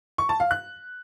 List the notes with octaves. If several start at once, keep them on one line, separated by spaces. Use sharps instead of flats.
C#6
A5
F5
F#6